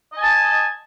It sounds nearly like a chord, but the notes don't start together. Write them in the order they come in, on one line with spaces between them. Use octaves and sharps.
D#5 G#5 A5